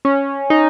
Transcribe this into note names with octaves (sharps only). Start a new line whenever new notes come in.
C#4
D#4